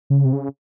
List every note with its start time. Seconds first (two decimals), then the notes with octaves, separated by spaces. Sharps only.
0.10 C#3
0.25 C3
0.33 C#3